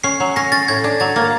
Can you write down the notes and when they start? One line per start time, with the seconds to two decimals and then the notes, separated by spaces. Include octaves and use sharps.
0.04 C#4 C7
0.20 F#3
0.36 C#4 A#6
0.52 C#4 A6
0.68 A2 G#6
0.84 D4
1.00 F#3 A6
1.16 A#3